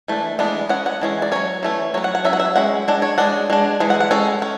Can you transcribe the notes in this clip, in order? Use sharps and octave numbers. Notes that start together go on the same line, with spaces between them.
E3 A3 D4
E3 G#3 B3 D4
G#3 C#4 F#5
F#5
E3 G#3 C#4
D5
F#3 A3 C#4 C#5
E3 A3 C#4
F#3 C#4 C#5
F#5
F#5
F#3 C#4 E5
F#5
E5
G#3 C#4 F#5
G#3 D4
C#5
G#3 D4 F#5
G#3 D4
E3 G#3
F#5
F#5
G#3 C#4 A4
C#4